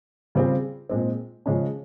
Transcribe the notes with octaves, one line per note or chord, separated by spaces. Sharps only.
C#3 G3 C4 F4 G#4
A#2 G#3 C4
C#3 F3 G#3 C#4